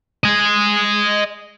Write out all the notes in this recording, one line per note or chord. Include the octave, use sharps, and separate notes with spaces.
D#5 G#5